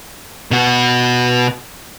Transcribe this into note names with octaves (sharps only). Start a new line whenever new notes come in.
B2 F#4